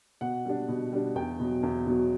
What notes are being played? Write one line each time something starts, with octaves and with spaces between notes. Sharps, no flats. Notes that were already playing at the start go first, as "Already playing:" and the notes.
B2 F#5
G3 D4
B2
G3 D4
E2 G5
B2 F#3
E2
B2 F#3